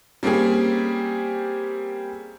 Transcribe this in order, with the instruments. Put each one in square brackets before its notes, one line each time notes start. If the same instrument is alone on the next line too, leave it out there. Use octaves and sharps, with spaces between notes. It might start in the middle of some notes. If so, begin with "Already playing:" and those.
[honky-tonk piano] G3 A#3 C4 C#4 G4 G#4